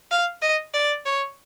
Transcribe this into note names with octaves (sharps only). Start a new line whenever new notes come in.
F5
D#5
D5
C#5